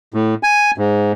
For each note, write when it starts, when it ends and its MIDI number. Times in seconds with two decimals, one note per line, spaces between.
0.14 0.35 45
0.43 0.71 80
0.78 1.12 44